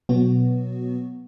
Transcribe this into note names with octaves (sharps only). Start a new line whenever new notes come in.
B2 F#3 B3 F#4